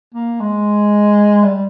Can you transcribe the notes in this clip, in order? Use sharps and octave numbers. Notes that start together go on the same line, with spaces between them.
A#3
G#3
G3